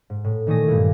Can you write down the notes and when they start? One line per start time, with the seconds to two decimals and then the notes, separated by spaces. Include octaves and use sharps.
0.10 G#2
0.24 A2
0.47 A#2 D#3 A3 G#5 D#6 A#6
0.68 G2 A#2 G#3 E4